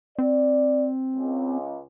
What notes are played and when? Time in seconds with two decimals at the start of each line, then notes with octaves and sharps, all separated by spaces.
0.19 C4 D5
1.16 C#2